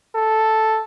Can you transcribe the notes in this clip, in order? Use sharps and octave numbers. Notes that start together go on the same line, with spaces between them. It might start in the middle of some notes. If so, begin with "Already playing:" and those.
A4